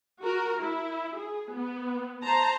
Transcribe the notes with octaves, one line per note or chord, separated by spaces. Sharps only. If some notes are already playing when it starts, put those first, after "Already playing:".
F#4 A#4
E4
G#4
B3
C5 A5 A#5